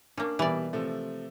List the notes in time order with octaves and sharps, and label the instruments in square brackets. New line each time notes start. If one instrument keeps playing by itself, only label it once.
[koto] A#3 C#4 [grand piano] D4
[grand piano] B2 G3 [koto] E3 D5
[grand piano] C3 F3 A3